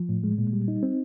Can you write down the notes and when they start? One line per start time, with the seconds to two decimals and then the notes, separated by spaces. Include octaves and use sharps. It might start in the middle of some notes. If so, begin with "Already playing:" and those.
Already playing: F3
0.09 A2
0.24 G#3
0.38 A#2
0.53 G3
0.68 D#4
0.83 C4